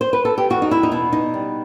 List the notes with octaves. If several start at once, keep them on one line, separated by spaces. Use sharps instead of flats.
C5
B4
A4
G4
E2 F#4
D#4
E4
D#4
B2 E4
D#4
G3